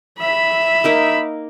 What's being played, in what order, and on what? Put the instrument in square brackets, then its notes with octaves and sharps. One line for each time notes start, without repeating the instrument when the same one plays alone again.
[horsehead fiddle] E5 B5
[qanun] A#3 D#4 A#4